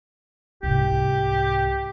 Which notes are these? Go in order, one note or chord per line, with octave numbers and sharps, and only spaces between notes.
C2 G#2 G4